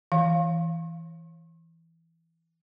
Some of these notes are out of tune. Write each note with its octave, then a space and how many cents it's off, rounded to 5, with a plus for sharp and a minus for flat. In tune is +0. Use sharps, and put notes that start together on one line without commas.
E3 +0 F5 +0